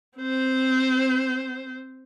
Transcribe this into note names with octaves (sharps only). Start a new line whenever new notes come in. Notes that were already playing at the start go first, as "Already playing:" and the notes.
C4 C5